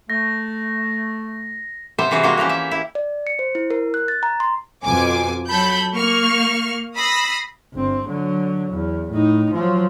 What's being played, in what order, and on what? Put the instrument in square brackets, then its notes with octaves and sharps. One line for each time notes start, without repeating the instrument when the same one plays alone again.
[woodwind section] A3 [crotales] A#6
[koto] C3 G3 B3 C5 E5
C3 E3 F#4 G#4
G3 G#3 A#3 F#4
E3 F3 C#4 G4
E5
E4
[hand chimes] D5
C#7
C5
E4
A#4
F#6
A6
A#5
C6
[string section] F2 B2 G#5 D6
F#3 A4 B5 G6
A#3 C#6 F6
B5 D#6 E6 A#6 C7
[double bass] G1 C4
D3 F#3
E2
A2 D#4
F3 F#3